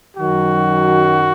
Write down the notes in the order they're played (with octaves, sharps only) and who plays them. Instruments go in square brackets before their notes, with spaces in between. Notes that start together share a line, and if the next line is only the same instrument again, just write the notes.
[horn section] F#2 D#3 F#3 F#4